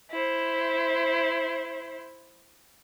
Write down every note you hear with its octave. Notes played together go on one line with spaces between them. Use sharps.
E4 C5